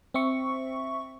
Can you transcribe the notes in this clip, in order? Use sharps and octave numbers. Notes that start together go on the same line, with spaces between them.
C4 E5 C#6